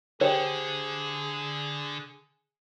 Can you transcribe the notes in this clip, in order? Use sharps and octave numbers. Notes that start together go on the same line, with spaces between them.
D3 G4 G#4 C5 C#5